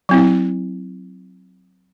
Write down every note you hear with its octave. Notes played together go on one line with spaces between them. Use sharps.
F#3 C4 E4